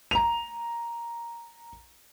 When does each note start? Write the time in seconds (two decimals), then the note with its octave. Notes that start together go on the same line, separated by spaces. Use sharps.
0.11 A#5 F7